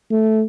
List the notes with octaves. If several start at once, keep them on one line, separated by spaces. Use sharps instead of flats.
A3